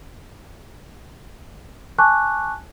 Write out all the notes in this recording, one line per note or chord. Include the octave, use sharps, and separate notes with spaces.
G#5 A5 C#6 D6 F#6